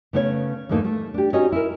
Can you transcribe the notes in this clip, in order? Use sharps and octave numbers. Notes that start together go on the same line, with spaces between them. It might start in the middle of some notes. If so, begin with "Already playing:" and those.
C#3 A3 B3 C#4 C5 C#5
E2 G#2 A3 A#3 D#4 A4
A3
D4 G4
C#4 D#4 F#4 C#5 D#5
E4 A#4